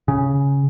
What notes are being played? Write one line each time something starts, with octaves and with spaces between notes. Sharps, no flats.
C#3